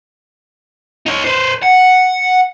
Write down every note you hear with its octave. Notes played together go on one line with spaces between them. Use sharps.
D#4 C#5
B4 C5
F#5